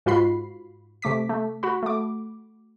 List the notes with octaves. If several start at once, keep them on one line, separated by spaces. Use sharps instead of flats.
G#2 F4 F#4 B5 C7
C3 A3 D6 B6
A3
F#4 F#5 B5
A3 D6